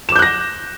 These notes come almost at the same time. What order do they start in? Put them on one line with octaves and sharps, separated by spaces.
E7 D6 G6 F#6 A#6